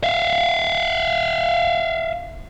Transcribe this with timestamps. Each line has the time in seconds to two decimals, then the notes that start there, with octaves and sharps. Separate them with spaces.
0.04 E5 F5